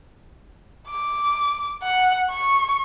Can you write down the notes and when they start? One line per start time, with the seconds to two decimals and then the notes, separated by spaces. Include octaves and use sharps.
0.89 D6
1.83 F#5
2.31 C#6